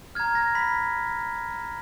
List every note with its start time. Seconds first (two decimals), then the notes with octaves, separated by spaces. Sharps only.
0.15 F6 G#6
0.20 A#5
0.35 A#6
0.55 B5 B6